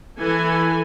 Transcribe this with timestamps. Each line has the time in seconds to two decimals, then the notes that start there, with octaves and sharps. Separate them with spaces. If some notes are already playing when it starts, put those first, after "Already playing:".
0.19 E3 A4 G#5